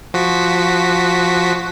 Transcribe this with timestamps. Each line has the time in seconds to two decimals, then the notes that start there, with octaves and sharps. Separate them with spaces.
0.14 F3 F#4 B6